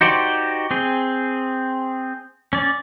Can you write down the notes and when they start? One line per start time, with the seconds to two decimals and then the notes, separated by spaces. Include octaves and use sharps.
0.01 D#4 F#4 G4 C5 D5
0.71 C4 G#4
2.53 C#4 D5